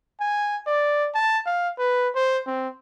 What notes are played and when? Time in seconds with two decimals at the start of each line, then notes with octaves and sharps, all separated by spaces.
0.20 G#5
0.67 D5
1.15 A5
1.46 F5
1.79 B4
2.15 C5
2.47 C4